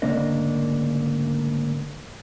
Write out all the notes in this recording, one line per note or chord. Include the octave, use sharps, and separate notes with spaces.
D2 G#2 C#3 A#3 D4 D#5